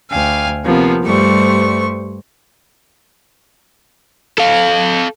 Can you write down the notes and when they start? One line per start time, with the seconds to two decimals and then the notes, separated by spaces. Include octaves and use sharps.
0.10 D2 F5 G5 G#5
0.63 C3 F3 A#3 B3
1.03 G2 G3 A3 C5 C#6
4.38 A4 F5